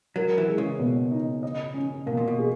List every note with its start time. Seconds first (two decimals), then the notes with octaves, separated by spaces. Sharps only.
0.16 F#3 A#4
0.38 E3
0.48 G#3
0.58 C#3
0.79 B2
1.11 D#4
1.43 D#5
1.74 C#4
2.06 B2 A#3
2.17 A#2
2.28 B2
2.38 G#4